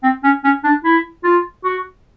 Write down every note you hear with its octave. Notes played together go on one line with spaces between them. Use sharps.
C4
C#4
C#4
D4
E4
F4
F#4